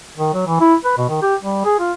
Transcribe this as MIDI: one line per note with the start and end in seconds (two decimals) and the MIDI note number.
0.18 0.34 51
0.34 0.45 54
0.47 0.59 52
0.60 0.75 64
0.85 0.94 71
0.98 1.06 47
1.10 1.22 51
1.22 1.35 67
1.42 1.62 55
1.65 1.78 68
1.79 1.92 65